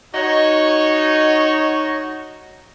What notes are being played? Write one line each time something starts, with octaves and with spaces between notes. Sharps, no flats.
D#4 F#4 C#5